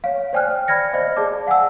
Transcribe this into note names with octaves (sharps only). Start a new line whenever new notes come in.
C#5 F5
C5 D5 G5 G#5 F6 F#6
D5 B5 F6 G#6 A#6 C#7
C5 D5 D#5 F5
G#4 D5 A5 D6
F5 F#5 G#5 A5 E6